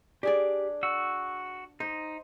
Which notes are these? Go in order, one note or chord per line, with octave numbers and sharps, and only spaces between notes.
D4 G4 G#4 D5
F#4 E6
D#4 C5